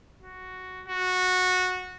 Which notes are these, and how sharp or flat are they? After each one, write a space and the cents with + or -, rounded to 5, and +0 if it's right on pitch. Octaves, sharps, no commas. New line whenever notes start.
F#4 +0
F#4 -15